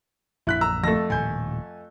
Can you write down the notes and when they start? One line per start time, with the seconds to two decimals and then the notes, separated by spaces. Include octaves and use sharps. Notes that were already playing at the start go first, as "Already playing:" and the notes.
0.47 A#1 F#2 E4 F#6 B6
0.61 A#5 E6
0.84 F2 A3 A5 E6 A#6
1.10 D#1 A2 G#5 G6